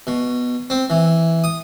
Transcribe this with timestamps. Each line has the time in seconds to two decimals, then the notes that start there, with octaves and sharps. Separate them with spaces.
0.07 B2
0.70 C4
0.90 E3
1.44 D#6